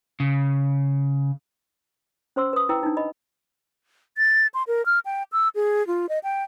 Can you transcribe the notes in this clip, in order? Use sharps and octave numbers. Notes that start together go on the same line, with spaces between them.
C#3
C#4 C5 C6 E6
B4 D#6
E4 B4 G5 E6
D4 D#4
D#5 B5
A6
C6
A#4
F6
G5
E6
G#4
F4
D#5
G5